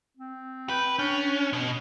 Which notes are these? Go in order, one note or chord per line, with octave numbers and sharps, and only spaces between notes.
C4
B4 G5
C#4 D4
B2